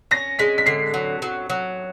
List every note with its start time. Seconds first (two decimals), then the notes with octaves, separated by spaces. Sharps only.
0.11 C#4 A#6
0.39 G#3 B6
0.58 B6
0.66 D3 C7
0.94 F#3
1.22 F#3
1.50 F#3